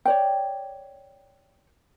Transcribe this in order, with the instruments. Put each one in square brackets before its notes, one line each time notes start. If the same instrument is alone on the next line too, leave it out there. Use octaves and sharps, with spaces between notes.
[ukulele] C#5 D5 G5